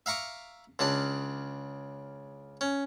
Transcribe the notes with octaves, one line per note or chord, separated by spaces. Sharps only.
E5 F5 A#5 C#6 D6
C#2 C#3 D4 A5
C#4